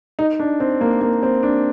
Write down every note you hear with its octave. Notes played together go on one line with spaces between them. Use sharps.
D#4
D4
C4
A#3
A#3
C4
D4